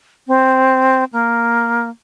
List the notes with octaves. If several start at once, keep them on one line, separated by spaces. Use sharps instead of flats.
C4
A#3